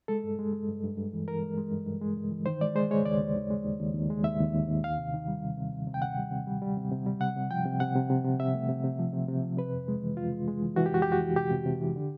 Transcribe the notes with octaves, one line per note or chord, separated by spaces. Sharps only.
G#3 A4
G2
G#3
G#3
G2
G2
G2
E3
E3 A#4
G#3
G#3
G2
G2
G#3
G2
E3
D#3 C5
G#3 D5
G#3 C5
G#3 C#5
D#2 D5
D#2
D#2
G#3
D#2
D#2
D#2
G#3
D#2 E5
D#2
D#2
D#2
D#3 F5
C3
D#3
G3
C3
C3
C3
C3
G5
C3 F#5
G3
C3
G3
G3
C3
C3
G3
C3 F#5
C3
F3 G5
C3
C3 F#5
C3
C3
C3
C3 E5
A3
C3
C3
F3
C3
C3
F3
C3 B4
F2
G#3
E3
F2 F4
G#3
G#3
E3
E3 F#4
G4
F2 F#4
G4
F2
F#4
E3
C3 G4
C3
C3
E3
D3